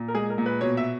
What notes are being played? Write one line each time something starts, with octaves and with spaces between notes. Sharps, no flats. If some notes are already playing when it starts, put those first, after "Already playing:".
Already playing: A#2
A#4
G#3 G#4
A#4
A#2
B4
B2 C#5
E5